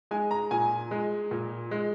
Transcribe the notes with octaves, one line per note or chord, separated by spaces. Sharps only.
G#3 G#5
A#5
A#2 G#5
G#3
A#2
G#3